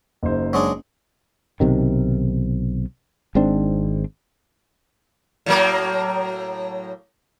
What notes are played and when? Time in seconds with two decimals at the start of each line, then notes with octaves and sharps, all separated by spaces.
0.23 F#1 D#4 C5
0.53 F#3 G#3 D4
1.60 B1 C3 D#3
3.35 G#1 G#2 C4 D4
5.46 A2 F#3 A#3